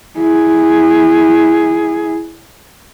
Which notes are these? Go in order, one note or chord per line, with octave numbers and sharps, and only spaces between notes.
E4 G#4